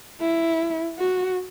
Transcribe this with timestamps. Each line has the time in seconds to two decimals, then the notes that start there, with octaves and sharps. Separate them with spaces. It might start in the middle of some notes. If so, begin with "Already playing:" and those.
0.20 E4
0.99 F#4